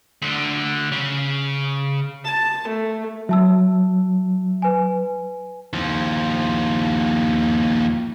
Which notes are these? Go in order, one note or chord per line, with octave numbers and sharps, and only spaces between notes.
D2 D3
C#3
A5
A3
F#3 E5 A5 E6
B4 G#5
D#2 F3